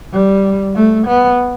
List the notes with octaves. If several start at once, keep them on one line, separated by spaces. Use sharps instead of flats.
G3
A3
B3